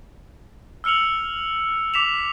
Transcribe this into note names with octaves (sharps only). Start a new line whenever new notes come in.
E6 F6 C#7 F7 F#7
D6 B6 E7 F7